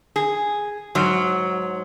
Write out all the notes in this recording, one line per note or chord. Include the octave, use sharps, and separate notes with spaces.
G#4
G#2 F#3